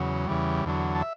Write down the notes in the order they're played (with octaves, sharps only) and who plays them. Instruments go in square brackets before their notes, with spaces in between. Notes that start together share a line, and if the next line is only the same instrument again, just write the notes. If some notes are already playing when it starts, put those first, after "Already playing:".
Already playing: [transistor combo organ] E2 C#3 F#3
E2 C#3 E3 G3
E2 D3 F#3
A5
E5